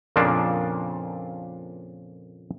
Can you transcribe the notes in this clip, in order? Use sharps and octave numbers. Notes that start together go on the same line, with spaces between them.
F2 A#2 C#3 F3 A#3 D4